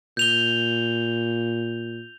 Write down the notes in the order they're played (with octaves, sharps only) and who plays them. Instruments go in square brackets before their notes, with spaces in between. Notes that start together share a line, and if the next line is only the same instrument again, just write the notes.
[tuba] A#2 [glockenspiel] G6 F7 G7